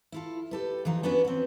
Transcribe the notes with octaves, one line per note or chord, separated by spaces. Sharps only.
E4 F4 A4
G4 A4 B4
E3 F3 D#4 A#4
B3 C#4 D4 F#4 B4
C4 C#4